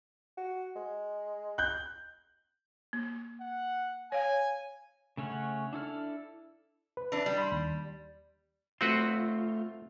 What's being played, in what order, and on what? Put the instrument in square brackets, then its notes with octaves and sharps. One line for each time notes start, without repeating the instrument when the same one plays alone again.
[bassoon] F#4
G#3
[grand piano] F#6 G6
[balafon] A#3
[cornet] F#5
[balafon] C#5 F5 [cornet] G#5
[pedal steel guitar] C#3 A3 C#4 C#5 F#5
D4 E4 A4 F6
[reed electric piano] B4
[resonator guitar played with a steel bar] E3 D4
G3
[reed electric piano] B5 C6
D#2
[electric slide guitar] A3 F4 [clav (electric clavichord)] C4 F#4 B4